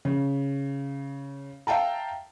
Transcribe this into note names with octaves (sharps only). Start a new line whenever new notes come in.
C#3
E5 F5 G5 A5 A#5